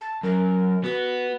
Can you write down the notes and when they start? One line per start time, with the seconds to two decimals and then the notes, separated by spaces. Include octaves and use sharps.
0.01 A5
0.23 F#2 A#4
0.84 B3 F#4